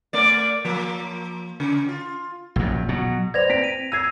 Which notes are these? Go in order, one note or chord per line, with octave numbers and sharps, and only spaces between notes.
A3 D5
F3 A#3
C#3
F4
A#1 F#2
B2 F#3
B4 C5 D5 G#6 A#6 F7
C4 B6 D7
D#7
E6 G#6 C7 D#7